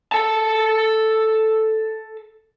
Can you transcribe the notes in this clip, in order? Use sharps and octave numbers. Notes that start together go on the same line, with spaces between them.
A4 A5